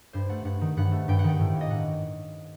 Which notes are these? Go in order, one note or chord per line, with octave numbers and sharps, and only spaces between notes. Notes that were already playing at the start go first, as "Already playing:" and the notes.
G2 C5
A3 F#5
G2 F#5
D#3
G2 F#5
A3
G2 G5
F#5
D#3 G5
A2
A#3
D#5
A2 F#5